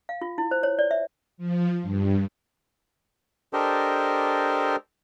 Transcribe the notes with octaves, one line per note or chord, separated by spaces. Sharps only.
F5
F4
E4
C5
C#5
D5
E5
F3
G2
D4 G4 A4 A#4 C5 D#5